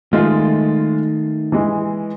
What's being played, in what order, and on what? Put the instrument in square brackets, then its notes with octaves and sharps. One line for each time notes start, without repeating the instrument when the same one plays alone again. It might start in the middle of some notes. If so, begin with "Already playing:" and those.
[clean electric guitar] D#3 A3 [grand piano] G#3 F4 D#5
[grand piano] E3 G#3